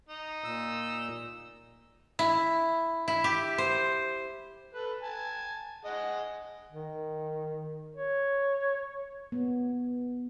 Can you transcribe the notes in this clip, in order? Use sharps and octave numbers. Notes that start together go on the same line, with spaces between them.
D#4
A#2 E6
E4
E4
G4
C5
A4 B4
G#5 A5
G#4 D#5 F#5
D#3
C#5
B3